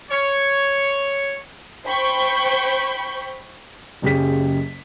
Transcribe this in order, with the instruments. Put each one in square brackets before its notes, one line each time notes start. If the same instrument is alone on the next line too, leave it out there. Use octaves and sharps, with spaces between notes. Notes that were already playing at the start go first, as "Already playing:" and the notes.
[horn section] C#5
[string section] C5 G5 B5 C#6 G6
[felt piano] F#1 F#2 C#3 G4 G#4 B6